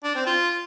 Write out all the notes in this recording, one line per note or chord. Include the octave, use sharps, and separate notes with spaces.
D4
C4
F4